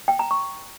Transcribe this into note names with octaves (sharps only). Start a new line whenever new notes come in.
G5
A#5
C#6